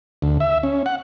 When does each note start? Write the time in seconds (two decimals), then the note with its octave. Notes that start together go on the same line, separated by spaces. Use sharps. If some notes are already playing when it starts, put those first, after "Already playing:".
0.22 D2
0.40 E5
0.63 C#4
0.86 F#5